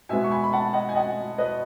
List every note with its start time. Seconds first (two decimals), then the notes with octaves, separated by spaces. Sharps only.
0.09 B2 G#3 B3 E5 G#5
0.24 C#6
0.31 G#5 B5
0.44 B5
0.53 F#5 A5
0.73 D#5 F#5
0.89 G#5
0.95 D#5 F#5
1.38 B4 D#5